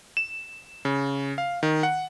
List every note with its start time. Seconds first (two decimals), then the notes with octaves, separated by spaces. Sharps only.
0.17 E7
0.85 C#3
1.38 F5
1.63 D#3
1.83 F#5